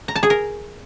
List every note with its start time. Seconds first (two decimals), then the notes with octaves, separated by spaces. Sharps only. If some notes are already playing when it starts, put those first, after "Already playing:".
0.08 A#5
0.16 A5
0.23 G#4
0.30 A#4